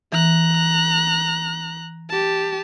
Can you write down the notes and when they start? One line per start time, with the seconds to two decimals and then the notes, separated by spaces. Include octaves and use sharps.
0.12 E3 A#5 F#6
2.10 G4 A5